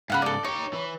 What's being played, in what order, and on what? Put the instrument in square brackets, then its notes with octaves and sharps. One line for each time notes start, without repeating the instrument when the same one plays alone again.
[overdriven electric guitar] G#2 C#3 [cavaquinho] F5 F#5 B5
[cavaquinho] A4 D5
[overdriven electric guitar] D#4 G4 [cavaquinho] C#5
[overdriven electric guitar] E3